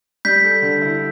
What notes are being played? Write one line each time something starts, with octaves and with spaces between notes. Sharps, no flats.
G3 G6 B6
A4
D3
E4